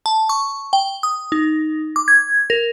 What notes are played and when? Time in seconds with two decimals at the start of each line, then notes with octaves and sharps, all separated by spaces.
0.06 A5
0.29 C#6
0.73 G5
1.03 D#6
1.32 D#4
1.96 D6
2.08 G#6
2.50 A#4